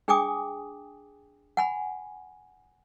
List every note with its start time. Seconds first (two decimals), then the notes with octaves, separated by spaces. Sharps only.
0.08 D4 G#4 G5 G#5 D6 D#6
1.57 F#5 G#5 B5